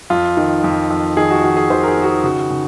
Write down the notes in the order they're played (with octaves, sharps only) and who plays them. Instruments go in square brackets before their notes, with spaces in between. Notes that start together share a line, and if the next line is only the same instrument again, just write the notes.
[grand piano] F2 F4
D#3
F2
F2
D#3 G#4
F#4
D#3 F#4
G#4
D#3 C5
A#4
G#4
D#3 F#4
G#4
C#3 F#4
C#3